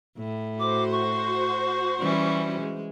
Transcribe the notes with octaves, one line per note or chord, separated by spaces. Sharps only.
A2
F#4 C5 D6
C#6
E3 G3 C#4
G#3